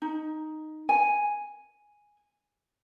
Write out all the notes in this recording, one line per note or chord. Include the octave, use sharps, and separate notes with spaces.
D#4
G#5